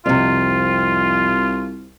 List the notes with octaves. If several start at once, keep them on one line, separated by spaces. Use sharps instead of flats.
C2 F2 C3 F4